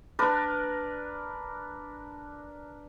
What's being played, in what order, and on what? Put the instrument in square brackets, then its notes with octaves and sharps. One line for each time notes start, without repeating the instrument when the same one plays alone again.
[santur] D4 A#4 B4 D5